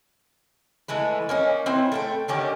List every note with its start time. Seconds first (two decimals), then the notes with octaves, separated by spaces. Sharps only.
0.88 E3 G#3 A3 B4
1.29 A#3 C#4 D#4
1.66 C4 E4 B4 C5
1.92 A3 F5 G5
2.28 D3 D#3 C#4 G4